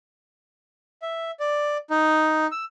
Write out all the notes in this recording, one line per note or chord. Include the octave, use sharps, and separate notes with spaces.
E5
D5
D#4
E6